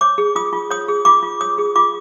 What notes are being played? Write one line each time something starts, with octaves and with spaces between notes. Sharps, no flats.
C#5 D6
G#4
F4 D#6
F4
C#5 D#6
G#4
F4 D6
F4
C#5 D#6
G#4
F4 D6